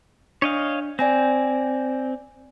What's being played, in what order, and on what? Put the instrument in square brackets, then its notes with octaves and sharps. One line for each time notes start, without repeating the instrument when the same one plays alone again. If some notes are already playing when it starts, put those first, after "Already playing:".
[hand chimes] D4 [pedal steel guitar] C#5 D#5 F5
[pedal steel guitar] C4 [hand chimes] D5 G#5 A#6